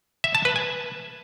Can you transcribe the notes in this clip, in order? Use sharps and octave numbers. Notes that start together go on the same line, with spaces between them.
E5
A5
B4
G#5